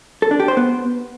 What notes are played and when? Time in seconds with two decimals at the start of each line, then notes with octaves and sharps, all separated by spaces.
0.22 A4
0.31 D4
0.40 G4
0.48 C5
0.57 B3